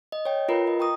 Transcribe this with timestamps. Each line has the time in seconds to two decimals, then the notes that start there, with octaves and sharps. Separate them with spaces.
0.12 D#5
0.25 C#5 G5
0.48 F4 A#4 B4 A#5 B5
0.67 D#5
0.79 G5 A#5 C#6 D#6